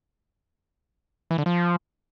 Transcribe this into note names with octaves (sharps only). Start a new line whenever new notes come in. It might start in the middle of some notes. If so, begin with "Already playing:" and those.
E3
D3
F3